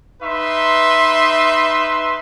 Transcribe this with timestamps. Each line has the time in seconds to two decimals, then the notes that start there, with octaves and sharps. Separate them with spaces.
0.22 D#4 B4 E5 C6